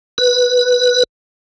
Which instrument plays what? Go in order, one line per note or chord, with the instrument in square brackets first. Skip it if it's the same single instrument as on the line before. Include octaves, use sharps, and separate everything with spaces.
[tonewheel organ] B4